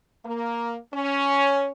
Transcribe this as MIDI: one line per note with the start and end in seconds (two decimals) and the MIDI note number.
0.25 0.75 58
0.94 1.72 61